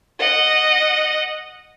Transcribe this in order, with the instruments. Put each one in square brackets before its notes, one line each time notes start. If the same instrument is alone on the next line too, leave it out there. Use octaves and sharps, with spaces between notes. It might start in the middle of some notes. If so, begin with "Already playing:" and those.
[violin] D#5 F#5